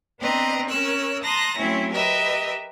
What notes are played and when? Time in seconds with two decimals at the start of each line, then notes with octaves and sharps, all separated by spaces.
0.20 B3 C4 D4 B4 D#5 A#5
0.69 C#4 A#4 C#5 E6 F#6
1.23 A5 A#5 C6 D#6 F#6 A#6
1.58 F#3 A3 C4 C#4 E4
1.92 G4 A#4 B4 D#5 E5